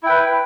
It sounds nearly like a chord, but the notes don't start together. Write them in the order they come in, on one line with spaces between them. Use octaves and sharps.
E4 G5 B4